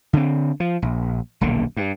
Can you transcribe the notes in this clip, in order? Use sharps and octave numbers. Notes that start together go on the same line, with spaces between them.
D3 C4
F3
A#1
D#1 B1 D3 A#3
G2